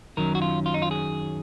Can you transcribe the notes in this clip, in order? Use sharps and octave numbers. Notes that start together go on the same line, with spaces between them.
F#2 D#3 F#3 C#4 A#4
F#4
F4
F4
D#4
F4
G#4